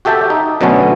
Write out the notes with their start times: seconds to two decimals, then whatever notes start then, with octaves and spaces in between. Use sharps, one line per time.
0.05 F#4 G4 A4 E5 G5 A5
0.30 D#4
0.61 B2 D3 F#3 A3 B3 C#4